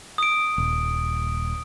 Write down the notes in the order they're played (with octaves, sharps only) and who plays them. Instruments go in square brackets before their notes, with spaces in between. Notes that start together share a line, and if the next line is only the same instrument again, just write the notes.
[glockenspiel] D#6 D7
[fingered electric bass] D#1